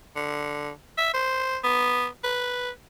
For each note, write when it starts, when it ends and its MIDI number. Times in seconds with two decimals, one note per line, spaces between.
0.16 0.71 50
0.98 1.11 76
1.14 1.58 72
1.64 2.07 59
2.24 2.70 71